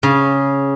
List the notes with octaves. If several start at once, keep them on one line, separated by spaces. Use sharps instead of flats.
C#3